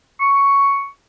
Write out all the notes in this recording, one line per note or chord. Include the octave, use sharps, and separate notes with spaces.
C#6